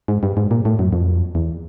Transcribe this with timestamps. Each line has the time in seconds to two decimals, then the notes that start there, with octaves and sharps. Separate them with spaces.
0.08 G#2
0.23 G2
0.37 G#2
0.51 A#2
0.65 A2
0.79 F#2
0.93 F2
1.35 E2